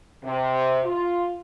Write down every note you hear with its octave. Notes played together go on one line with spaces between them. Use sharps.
C3
F4